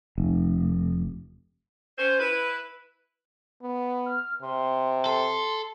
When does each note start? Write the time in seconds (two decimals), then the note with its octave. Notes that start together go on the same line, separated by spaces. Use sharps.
0.18 F1
1.98 C#4 C5
2.20 E4 B4
3.62 B3
4.06 F6
4.42 C3 C6
5.06 A4 C6